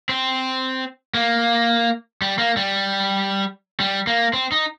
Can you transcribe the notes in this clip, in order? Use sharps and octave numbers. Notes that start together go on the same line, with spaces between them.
C4
A#3
G3
A#3
G3
G3
A#3
C4
D#4